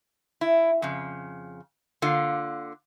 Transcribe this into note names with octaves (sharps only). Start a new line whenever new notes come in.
E4
F2 C#3
D3 A#3 F4 F5